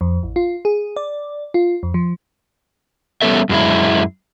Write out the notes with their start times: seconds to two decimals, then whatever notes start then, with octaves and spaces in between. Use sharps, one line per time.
0.01 F2
0.23 A1
0.36 F4
0.65 G#4
0.96 D5
1.54 F4
1.83 F2
1.94 F3
3.22 G3 B3 C#4 A4 E5
3.49 F#2 G#3 E4